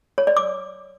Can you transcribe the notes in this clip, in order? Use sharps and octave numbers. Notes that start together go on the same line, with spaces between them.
C#5
D5
D6